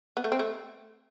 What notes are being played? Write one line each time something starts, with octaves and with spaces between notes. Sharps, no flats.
B3
A3
C4
A3